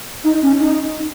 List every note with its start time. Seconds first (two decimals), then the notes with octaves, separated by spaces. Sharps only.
0.24 D#4
0.42 C#4
0.59 D#4